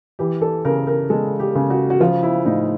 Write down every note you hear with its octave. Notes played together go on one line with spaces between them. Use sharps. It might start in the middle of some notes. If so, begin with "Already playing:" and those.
E3 G4
A4
C#3 A#4
A#4
G#3 A4
G4
C#3
F#4
F#4
F3 F4
E4
A2 D#4